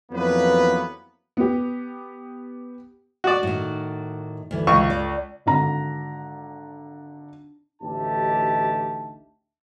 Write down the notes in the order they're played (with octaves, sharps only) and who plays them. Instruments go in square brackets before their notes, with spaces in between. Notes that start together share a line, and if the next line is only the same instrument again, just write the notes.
[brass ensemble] F2 E3 F#3 A#3 B3 B4
[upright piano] B3 G4
[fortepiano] F#4 D5
[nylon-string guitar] A2 D#3
D2 E3
[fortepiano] C#2 C#6
[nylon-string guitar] D5
[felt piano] G#1 D3 A#5
[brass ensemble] A1 D2 D#4 G4 E5 A5